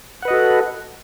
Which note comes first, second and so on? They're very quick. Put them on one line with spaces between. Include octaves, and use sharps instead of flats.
F#5 B4 D#5 F#4 A4